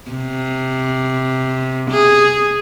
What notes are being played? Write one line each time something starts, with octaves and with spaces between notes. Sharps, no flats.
C3
G#4